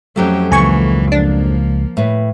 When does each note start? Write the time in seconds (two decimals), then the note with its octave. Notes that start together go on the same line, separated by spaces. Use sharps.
0.16 F2 F#3 A3 C#4 G4
0.52 C#2 E3 A#3 G#5 C#6
1.12 F3 A#3 D4
1.97 A2 B4